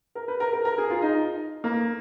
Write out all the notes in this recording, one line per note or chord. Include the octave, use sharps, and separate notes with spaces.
A#4
B4
A#4
A#4
A#4
G#4
F4
D#4
A#3